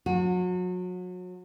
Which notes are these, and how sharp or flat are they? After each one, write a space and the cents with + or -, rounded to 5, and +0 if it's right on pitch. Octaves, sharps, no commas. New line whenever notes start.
F#3 -35 F#4 -35